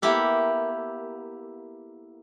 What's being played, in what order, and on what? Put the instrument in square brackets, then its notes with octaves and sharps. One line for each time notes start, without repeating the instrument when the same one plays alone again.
[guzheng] A#3 B3 E4 G4 A4